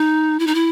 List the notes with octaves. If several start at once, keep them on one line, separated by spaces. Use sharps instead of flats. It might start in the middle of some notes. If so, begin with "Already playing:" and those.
Already playing: D#4
E4
D#4
E4